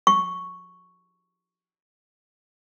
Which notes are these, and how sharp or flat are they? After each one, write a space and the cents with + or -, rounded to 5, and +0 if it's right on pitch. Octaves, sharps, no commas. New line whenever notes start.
C#6 +0